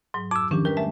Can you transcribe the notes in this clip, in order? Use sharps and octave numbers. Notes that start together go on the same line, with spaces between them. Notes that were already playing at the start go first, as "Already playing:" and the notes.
G#2 F#3
F2 D6 E6
D#3 F3 C#4 D4 G4
D#3 G3 A#4 B4
G#3 A3 E5